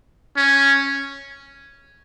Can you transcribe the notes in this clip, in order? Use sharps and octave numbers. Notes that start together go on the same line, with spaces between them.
C#4